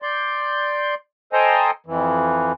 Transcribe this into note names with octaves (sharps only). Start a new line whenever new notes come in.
D5 C6 G6
A4 C5 D#5 G5 G#5 A#5
F2 E3